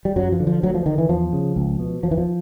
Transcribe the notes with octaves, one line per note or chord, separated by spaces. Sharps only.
G3
F#2 F#3
F3
D3
F3
D2 F#3
F3
D3 D#3
E3
E2 F3
C#3
C#2
B2
E2 F3
E3
F3